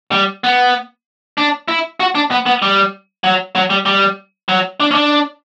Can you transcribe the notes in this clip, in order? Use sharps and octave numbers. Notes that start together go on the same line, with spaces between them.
G3
B3
D4
E4
F#4
D4
B3
B3
G3
F#3
F#3
G3
G3
F#3
D4
C#4
D4